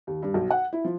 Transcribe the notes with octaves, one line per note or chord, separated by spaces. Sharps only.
D#2
G2
B1
F#5
E4
F3